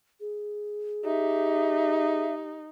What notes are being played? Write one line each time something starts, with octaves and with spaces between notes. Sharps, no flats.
G#4
D#4 G4 E5